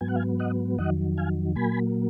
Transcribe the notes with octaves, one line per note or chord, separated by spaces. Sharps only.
G#2 F#3 B3 G#5
F#5
F5 G#5
D#5 F#5
F2 D#3 F#3 D#5 F#5
F5 G#5
A#2 F#3 A#3 G#5 B5